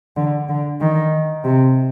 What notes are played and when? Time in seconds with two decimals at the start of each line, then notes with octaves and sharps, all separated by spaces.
0.17 D3
0.49 D3
0.81 D#3
1.45 C3